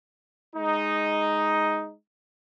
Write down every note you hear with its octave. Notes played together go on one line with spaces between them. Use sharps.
G#3 D#4